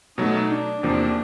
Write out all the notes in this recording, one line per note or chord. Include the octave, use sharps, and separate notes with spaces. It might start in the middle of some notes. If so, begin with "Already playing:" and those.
B2 F#3 A3 D#4
D4
E2 C3 F3 A#3 D4